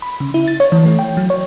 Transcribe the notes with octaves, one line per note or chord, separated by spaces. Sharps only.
B5
C#3
E4
A6
C#5
E3
A3
G5
F#3
C#5